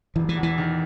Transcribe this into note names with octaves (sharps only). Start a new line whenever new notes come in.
E1 E3
E3
E2
E3
D#3